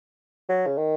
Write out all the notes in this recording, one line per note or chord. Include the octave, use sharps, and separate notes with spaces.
F#3
C#3
D#3